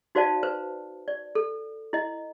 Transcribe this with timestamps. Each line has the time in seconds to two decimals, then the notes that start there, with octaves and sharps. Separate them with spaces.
0.15 D#4 F#4 C5 D5 F5 A5
0.43 B4 C5
1.08 D5
1.35 A4
1.93 E4 D#5